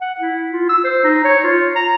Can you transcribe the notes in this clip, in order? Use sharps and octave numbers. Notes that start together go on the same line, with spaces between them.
F#5
E4
F4
E6
C5
D#4
C#5
F4
A#5